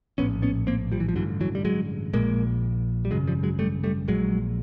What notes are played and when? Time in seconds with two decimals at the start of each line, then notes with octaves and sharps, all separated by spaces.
0.18 A#1 A2 B3 C#4
0.42 B3 C#4
0.67 A#3 C4
0.92 F3 G3
1.00 E3
1.09 F3
1.15 A1 G2 D3 E3 F#3
1.41 E3 F#3
1.55 G3
1.65 F#3 G#3
2.13 A#1 A#2 G#3 A#3
3.05 G3
3.11 G#1 F#2 C#3 F#3 G#3
3.27 F3 G3
3.43 F#3 G#3
3.59 G3 A3
3.84 G3 A3
4.08 A#1 A#2 F#3 G#3